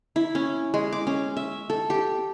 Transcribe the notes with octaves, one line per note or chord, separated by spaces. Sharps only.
E4
C#4
G#3
D6
C#4
E5
A4
G4